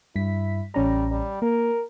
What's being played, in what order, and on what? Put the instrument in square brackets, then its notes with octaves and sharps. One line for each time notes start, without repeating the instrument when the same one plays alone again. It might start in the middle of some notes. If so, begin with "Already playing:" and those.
[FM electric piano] G2 B6 [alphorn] E4
[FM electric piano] A1 C#4 A#5 [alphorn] G3
[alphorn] G3
[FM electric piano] A#3 [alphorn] A#4